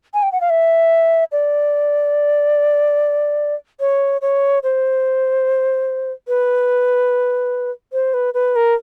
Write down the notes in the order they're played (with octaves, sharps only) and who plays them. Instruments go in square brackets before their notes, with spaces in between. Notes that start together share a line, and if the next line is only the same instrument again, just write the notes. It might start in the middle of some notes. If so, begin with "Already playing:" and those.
[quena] G#5
G5
F#5
F5
E5
D5
C#5
C#5
C5
B4
C5
B4
B4
A#4